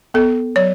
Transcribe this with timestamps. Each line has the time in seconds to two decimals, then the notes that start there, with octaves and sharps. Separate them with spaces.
0.14 B3 A4
0.56 F#3 C#5